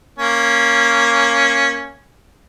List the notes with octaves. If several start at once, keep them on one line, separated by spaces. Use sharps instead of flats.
A#3 C#4